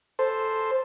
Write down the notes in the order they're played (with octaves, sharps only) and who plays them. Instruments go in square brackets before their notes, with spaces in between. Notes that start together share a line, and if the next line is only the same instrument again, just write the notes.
[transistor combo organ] A4 C5